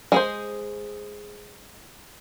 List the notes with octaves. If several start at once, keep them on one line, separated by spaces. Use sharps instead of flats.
G#3 G#4 C5